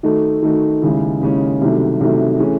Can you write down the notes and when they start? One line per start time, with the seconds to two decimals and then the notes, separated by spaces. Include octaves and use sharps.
0.03 D#3 A3 D#4 F#4 A4
0.42 D#3 A3 D#4 F#4 A4
0.82 D#2 C#3 G#3 C#4 E4
1.21 D#2 C#3 G#3 C#4 E4
1.61 C2 C3 D#3 F#3 A3
2.00 C2 C3 D#3 F#3 A3
2.39 E3 A3 C#4 G#4